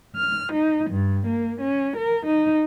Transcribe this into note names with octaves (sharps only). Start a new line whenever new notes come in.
F6
D#4
G2
A#3
C#4
A#4
D#4